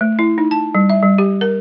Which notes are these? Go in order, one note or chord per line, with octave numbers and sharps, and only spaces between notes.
A3
E4
D#4
A5
G3
E5
G3
G4
A#4